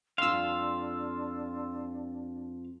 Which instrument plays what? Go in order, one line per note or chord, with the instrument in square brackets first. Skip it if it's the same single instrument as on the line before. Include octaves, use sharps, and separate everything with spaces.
[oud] F2 F4 [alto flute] D4 [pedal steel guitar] F5 [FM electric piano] C6 E6